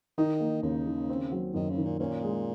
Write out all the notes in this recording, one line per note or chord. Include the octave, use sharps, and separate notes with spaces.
D#3 D#4
A#3
D#2 C#3
D#3
C4
F#3
F#2 D#3
C#3
D#3
A#2
A#2 C#4
G#3